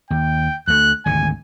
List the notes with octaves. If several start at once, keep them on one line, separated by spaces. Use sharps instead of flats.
D#2 G5
D2 A3 F#6
G#1 D2 C3 G#5